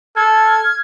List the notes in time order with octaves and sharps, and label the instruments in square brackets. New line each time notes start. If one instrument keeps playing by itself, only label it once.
[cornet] A4 [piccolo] F6 [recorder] G#6